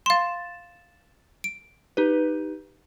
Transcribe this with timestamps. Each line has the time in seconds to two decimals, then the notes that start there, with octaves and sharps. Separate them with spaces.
0.06 F5 C6 A6 E7
1.44 D7
1.97 D#4 G4 B4